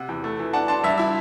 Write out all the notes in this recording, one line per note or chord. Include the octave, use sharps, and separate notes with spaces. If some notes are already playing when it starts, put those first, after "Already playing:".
Already playing: C3 F#5
E2
A3
E3
D4 F#5 A5
D4 A5 C6
G2 E5
E4 E5